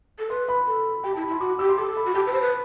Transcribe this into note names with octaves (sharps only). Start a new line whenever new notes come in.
A4
B4 C6
B5
A4
G4 G5
E4 A5
B5
E4
C6
F#4 D6
G4 E6
C6
A4 D6
B5
F#4
G4 A5
B4
C5 B5
B4